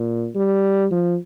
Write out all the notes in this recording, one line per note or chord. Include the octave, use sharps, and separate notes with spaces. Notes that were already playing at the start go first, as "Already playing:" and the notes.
Already playing: A#2
G3
F3